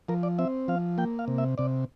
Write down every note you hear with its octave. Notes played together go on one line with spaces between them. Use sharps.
F3 A#4
D5
C4 E5
F3 F5
A#3 G5
F5
C3
E5
C3 D5